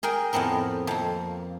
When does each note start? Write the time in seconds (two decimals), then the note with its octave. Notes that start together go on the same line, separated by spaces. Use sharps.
0.03 G#4 A#4 G5 G#5
0.33 F2 A2 B3 C4 A#4
0.87 F2 A#3